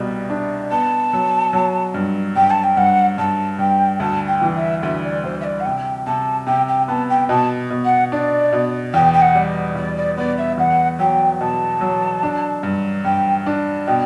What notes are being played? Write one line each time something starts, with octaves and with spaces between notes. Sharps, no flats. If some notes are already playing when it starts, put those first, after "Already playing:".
Already playing: C2 B2 G3
D4
B3 A5
F#3
F#3
G2
G2 G5
A5
G5
G2 F#5
G2 A5
G2 G5
D2 A5
G5
E3
E5
D2 E5
D5
D2 C5
E5
D5
F#5
C3 G5
C3 A5
C3 G5
G5
B3 A5
G5
B2 A5
B2
F#5
D4 D5
B2
E2 G5
G5
F#5
G3
E2 D5
D5
B3 D5
E5
E2 F#5
F#3 G5
B2 A5
F#3
D4
G2
G2 G5
D4
B2 G5